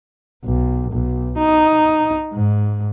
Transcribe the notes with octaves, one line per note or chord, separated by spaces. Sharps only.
B1
B1
D#4
G#2